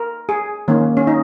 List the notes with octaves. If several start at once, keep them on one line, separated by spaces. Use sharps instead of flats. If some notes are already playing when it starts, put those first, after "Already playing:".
Already playing: A#4
G#4
D#3 A#3 C#4
C#4
D#4